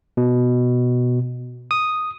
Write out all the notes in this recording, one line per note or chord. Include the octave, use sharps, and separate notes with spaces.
B2
D#6